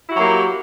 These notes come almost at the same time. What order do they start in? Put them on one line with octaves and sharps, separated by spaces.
E4 F#4 F#3 A#3 G4